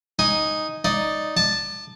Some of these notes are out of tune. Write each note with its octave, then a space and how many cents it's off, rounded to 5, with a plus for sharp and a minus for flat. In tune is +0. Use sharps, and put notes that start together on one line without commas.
D#4 +0 G#5 +0
D#4 +0 D5 +0
A5 +0 D6 +35